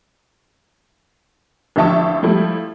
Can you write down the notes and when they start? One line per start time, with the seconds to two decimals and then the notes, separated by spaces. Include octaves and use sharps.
1.76 A1 D3 F3 E5 A5 C#6
2.23 F3 G3 A3 E4